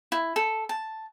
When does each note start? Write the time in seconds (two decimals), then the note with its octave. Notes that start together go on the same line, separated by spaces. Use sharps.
0.12 E4
0.36 A4
0.69 A5